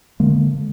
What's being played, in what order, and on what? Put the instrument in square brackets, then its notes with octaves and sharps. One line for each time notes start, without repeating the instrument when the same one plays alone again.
[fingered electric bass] D3 G#3 A#3